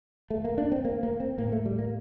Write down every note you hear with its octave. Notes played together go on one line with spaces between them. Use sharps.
A3
A#3
D4
C4
A#3
A#3
C4
A2 A#3
A3
G3
A#3